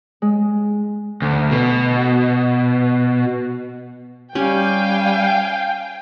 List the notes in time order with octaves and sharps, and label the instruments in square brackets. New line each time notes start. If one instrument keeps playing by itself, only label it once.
[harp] G#3
[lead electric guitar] D2
B2
[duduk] G3 [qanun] C#4 G4 [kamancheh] F5 G#5 [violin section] G5